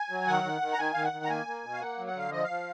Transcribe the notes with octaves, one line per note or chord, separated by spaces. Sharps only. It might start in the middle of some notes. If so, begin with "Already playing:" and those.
Already playing: G#5
F#3
D#3 F#5
D#3
D#3
A#5
D#3 G#5
D#3 F5
F#5
D#3
A#5
A#3 G#5
A#3
B2
F5
A#3 F#5
F#3
F#5
D3 F5
F3 D#5
F5
F3